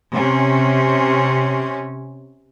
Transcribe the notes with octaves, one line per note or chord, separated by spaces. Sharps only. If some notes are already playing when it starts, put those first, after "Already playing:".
C3 C#4